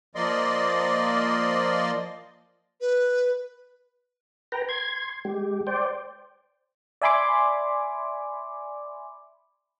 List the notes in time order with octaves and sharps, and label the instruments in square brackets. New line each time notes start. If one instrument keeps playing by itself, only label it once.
[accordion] F3 A#3 D5 D#5 C6
[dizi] B4
[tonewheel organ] B4 G5 A#5
C6 G#6
G#3 G4
C5 D5 G5
[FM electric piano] D5 E5 G#5 B5 C6 D6